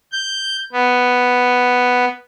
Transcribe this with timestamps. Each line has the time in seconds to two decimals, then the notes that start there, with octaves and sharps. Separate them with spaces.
0.12 G6
0.73 B3